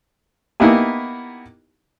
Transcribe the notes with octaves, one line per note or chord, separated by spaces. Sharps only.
A#3 B3 D#4 E4 G4 G#5